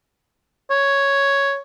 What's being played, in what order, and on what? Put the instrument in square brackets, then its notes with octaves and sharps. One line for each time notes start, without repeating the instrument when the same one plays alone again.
[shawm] C#5